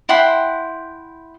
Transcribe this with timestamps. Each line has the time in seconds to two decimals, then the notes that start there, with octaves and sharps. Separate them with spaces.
0.09 E4 F#5 G5 C6